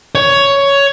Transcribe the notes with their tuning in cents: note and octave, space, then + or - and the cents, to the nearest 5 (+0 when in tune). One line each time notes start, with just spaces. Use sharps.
C#5 +10